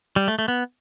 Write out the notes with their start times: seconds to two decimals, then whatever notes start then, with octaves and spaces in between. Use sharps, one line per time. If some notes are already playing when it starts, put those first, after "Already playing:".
0.16 G3
0.28 A3
0.39 A3
0.48 B3